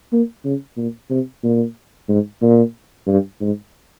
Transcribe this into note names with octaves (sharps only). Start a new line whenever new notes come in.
A#3
C#3
A#2
C3
A#2
G#2
A#2
G2
G#2